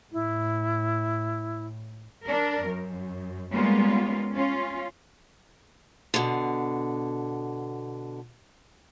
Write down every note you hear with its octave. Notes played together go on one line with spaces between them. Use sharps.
A2 E4
D4 A#4
F#2
G3 G#3 A#3 B3 C#4 F4
C#4 F4
B2 D3